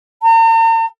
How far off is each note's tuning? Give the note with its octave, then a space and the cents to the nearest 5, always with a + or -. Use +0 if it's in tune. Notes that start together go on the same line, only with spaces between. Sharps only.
A#5 -45